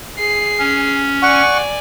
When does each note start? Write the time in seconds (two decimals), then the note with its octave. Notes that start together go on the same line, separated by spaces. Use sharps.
0.18 G#4 C7
0.59 C#4
1.22 D5 F#5 G#5 C#6